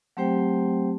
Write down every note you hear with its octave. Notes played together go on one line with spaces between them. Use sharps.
F#3 A3 C4 G4 C5 G5